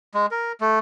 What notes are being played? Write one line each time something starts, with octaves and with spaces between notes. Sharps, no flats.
G#3
A#4
A3